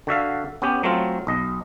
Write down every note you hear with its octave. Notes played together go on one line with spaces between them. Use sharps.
D3 F#4 E5 F5
B3 C#4 G4
F#3 A3 C4 F4
B1 D#5